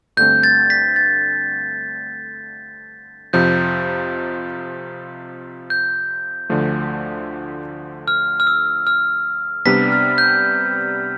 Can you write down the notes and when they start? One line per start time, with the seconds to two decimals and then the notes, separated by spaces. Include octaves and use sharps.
0.17 G2 D3 A3 C4 G6
0.43 A6
0.70 B6
0.96 A6
3.33 F2 C3 F3 G6
5.70 G6
6.50 D2 D3 F3 A3
8.08 F6
8.40 F6
8.47 E6
8.87 F6
9.65 C3 G3 B3 D4 B6
9.92 F6
10.18 G6